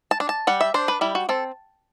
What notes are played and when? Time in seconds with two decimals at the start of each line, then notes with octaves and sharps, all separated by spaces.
0.11 A5
0.20 D4
0.29 A5
0.47 G3 F#5
0.61 E5
0.74 D4 C5
0.88 B4
1.01 G3 E4
1.15 F#4
1.29 C4 A4